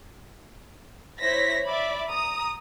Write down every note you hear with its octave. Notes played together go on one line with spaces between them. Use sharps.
E4 C5 C#5 A#6 B6
D5 E5 B5 D6
A#5 D#6